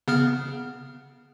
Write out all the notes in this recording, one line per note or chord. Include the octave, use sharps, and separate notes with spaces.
C#3 B3 F6